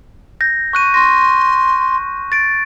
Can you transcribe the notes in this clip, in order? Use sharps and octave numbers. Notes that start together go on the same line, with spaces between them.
G6 A#6
C#6 F#6 D#7
C6 A#6
A6 D7